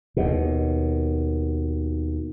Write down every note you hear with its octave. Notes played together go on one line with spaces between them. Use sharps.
D#2 B2